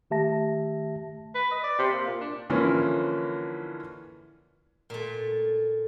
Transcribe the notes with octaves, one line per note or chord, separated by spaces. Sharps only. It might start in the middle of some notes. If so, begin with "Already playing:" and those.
D#3 A3 G4 E5 A5 A#6
B4
D#5
D5
C3
A#3
A#2
D4
D3 E3 F3 A#3 C#4 E4
A#2 A3